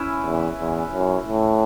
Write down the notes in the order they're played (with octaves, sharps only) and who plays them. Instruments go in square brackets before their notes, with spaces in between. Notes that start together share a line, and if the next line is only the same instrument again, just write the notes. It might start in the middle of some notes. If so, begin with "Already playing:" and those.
Already playing: [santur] C#4 E4 B4 E5
[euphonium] E2
E2
F#2
A2